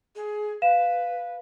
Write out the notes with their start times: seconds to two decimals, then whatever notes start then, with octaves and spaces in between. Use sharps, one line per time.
0.16 G#4
0.62 B4 F5 E7